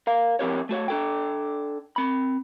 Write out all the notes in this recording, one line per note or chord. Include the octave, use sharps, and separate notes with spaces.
A#4 F5
F3 C4 E4 G4 A#4 C#5
A3 F#4 C#5
D4 A4 G5
C4 B5